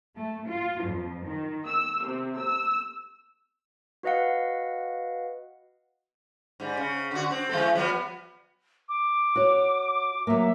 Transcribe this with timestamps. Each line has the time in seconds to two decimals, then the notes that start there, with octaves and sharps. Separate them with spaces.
0.16 A3
0.48 F4
0.84 F2
1.26 D#3
1.66 E6
2.06 C3
2.38 E6
4.03 F#4 B4 D#5 F5 F#5
6.60 G#2 G3
6.77 C#3
7.11 D3 F#4
7.31 C4
7.49 E3 G#3 A4
7.75 F3 G3 B3
8.89 D6
9.36 F#4 C#5
10.27 F#3 A#3 E5